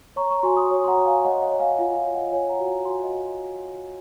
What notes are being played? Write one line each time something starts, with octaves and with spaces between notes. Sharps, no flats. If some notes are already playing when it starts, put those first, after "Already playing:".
C#5 A#5 C#6
A#5 C#6
F#4 G#5 C6
C6 D#6
C#5
C6
F#5 A#5
C#5
F5 G#5
C#5 D#5 F#5
D#5 F#5
C#5
F5 G#5
F4 F5 G#5
F5
C#5
D#5 F#5
C#5 F5 G#5
F#5 A#5
F#4
F#5 A#5
F#4 G#5 C6
D#5 F#5